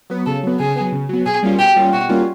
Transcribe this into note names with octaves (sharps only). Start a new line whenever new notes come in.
F#3 B3
C#3 A4
F#3 B3
C#3 G#4
F#3 B3
C#3
F#3 B3
B2 G#4
G3 A#3 C#4 F4
B2 G4
G3 A#3 C#4 F4
B2 F#4
G3 A#3 C#4 F4